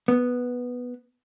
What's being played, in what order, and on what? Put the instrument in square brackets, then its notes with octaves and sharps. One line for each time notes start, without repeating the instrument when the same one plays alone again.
[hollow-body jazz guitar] B3